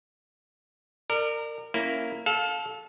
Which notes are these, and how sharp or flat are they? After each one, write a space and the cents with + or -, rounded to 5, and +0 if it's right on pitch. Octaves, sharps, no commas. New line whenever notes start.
A#4 -20 D5 +30
A#3 +0 C#4 +0 E4 +5
A4 -20 F5 +20